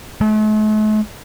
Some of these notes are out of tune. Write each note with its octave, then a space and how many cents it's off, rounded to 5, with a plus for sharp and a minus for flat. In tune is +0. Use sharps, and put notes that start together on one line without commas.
A3 -45